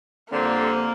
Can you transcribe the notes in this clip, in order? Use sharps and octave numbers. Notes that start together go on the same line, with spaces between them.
F2 D3 G3 A#3 C4